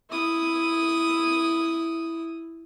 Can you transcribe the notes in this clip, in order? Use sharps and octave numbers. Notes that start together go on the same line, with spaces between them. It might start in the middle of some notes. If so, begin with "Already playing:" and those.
E4 D#6